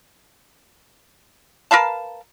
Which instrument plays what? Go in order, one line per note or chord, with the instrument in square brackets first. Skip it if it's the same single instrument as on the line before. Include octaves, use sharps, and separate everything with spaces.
[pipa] A#4 B4 F5 A5